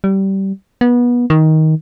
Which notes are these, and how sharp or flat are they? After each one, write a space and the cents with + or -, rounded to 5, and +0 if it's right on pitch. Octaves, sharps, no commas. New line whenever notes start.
G3 -20
B3 -25
D#3 +15